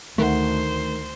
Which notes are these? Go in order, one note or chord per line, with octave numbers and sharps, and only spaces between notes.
D2 D#3 A3 C5 F#5